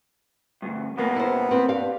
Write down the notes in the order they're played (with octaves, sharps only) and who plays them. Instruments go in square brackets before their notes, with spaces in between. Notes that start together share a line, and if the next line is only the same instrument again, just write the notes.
[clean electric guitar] D2 G2
[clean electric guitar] D#2 B2 A#3 [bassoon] B3
[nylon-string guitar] E4 C5
C4 B4
[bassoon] G2 [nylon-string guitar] G4 F5